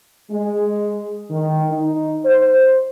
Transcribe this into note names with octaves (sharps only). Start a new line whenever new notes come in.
G#3
D#3
D#4
C5